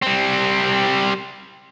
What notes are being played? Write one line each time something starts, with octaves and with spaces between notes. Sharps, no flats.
G3 C4